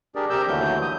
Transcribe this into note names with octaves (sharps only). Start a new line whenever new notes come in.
D4 G4 G#4 A#4 D5
C3 G4 A#4 E6 G6
D#2 D3 E3 F#3 A3 G6
D#6 G6